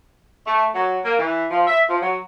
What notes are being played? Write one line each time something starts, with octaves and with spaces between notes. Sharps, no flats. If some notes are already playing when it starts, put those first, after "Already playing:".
A3
F#3
A#3
E3
F3
E5
F3
F#3